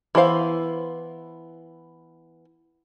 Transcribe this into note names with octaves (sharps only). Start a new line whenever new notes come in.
E3 B3 E4 C5 F5